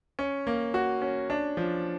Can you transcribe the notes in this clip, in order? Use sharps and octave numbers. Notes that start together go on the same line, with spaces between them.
C#4
A#3
F#4
C#4
D4
F3